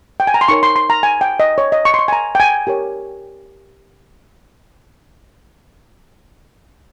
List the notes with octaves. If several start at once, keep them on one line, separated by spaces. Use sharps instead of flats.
G5
G#5
A#5
C6
D#4 A#4 C#5 C#6
C6
C6
A#5
G#5
G5
D#5
C#5
D#5
C#6
C6
C#6
G#5
A#5
G5
G#5
G4 A#4 C#5